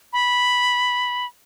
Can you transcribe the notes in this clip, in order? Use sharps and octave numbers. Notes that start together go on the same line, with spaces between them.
B5